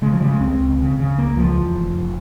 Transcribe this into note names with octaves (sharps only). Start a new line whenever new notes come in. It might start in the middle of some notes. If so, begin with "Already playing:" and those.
C#3 G#3
F3
C#3 G3
G#3
C#2 C4
C#2
C#3
C#3
C#2 A#3
C#2 F3
E2
F1
F1